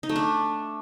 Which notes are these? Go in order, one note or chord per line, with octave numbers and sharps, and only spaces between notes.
D#4
A3
D4